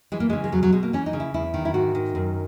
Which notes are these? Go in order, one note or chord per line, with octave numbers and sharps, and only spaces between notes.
E3 G#3
A#3
C#3 G#3
G#3
E2 F#3
F#3
B2 G#3
A#3
E3 C#4
D#4
C#3
E4
E2 E4
D#3
E4
G#2 F#4
D#3
F#2